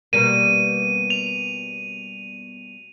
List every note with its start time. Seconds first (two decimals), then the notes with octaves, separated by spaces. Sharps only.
0.13 B2 G3 A#3 D#7
1.10 F7